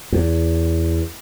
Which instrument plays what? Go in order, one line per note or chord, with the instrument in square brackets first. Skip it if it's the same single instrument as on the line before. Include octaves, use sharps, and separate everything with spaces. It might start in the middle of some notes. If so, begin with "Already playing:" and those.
[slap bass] E2